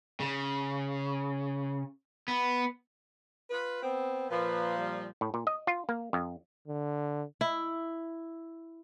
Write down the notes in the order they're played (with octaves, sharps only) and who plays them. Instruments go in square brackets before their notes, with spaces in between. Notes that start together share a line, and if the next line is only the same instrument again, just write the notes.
[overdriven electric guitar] C#3
B3
[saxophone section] F4 B4
B3 C4
[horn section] A#2 F3 [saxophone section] B4
[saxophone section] G3
[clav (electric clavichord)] A2
A#2
D#5
F4
A#3
F2
[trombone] D3
[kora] E4